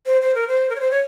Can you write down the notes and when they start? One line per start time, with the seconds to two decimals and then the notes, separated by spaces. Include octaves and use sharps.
0.06 C5
0.21 C5
0.35 A#4
0.48 C5
0.70 A#4
0.75 C#5
0.80 C5
0.91 C#5